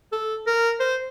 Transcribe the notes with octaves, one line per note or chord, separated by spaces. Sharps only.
A4
A#4
C5